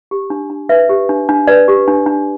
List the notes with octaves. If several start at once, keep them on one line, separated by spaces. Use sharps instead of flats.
G4
D4
D4
B4 E5
G4
D4
D4
B4 D5
G4
D4
D4